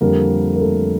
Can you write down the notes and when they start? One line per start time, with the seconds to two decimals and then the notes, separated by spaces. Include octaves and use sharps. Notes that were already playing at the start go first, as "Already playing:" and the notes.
0.01 F2 D3 G3 A#3 A#4
0.56 A#4
0.61 A3 A4